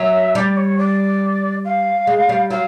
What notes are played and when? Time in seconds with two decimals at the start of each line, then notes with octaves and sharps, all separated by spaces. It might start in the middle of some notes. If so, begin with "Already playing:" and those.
Already playing: F#3 E5
0.35 G3 D5
0.57 C#5
0.78 D5
1.65 F5
2.07 G#3
2.29 G3
2.50 F#3 F5